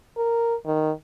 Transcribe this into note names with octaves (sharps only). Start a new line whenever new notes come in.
A#4
D#3